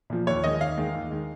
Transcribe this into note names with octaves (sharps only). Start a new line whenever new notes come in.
A#2 F3
D#2 C#5
D#3 G#3 D#5
D#2 F5
D#3 G#3
D#2
D#3 G#3